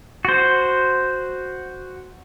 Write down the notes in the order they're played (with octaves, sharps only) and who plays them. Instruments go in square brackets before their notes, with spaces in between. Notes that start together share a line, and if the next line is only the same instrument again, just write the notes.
[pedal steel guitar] F#4 C5